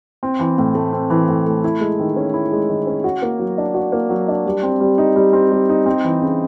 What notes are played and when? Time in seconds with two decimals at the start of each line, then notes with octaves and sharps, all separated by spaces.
0.23 C4
0.40 E3
0.58 A2
0.75 A3
0.92 C4
1.10 E3
1.29 A2
1.46 A3
1.64 E4
1.80 G#3
1.99 D#3
2.16 C#4
2.34 E4
2.52 G#3
2.70 D#3
2.87 C#4
3.04 F#4
3.22 A#3
3.39 F#3
3.58 D4
3.74 F#4
3.92 A#3
4.10 F#3
4.28 D4
4.46 G3
4.63 C4
4.80 G3
4.98 D#4
5.16 G3
5.33 C4
5.52 G3
5.69 D#4
5.86 C4
6.04 E3
6.21 C#3